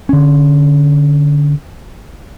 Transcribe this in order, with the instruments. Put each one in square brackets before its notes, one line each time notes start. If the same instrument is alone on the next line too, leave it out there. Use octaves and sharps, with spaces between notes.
[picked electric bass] D3 C#4